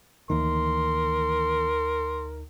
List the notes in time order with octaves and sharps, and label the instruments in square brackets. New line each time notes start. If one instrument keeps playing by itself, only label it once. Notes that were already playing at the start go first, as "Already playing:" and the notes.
[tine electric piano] D2 D#4 [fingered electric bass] D#3 E3 A#3 [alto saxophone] A#4 [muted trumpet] C6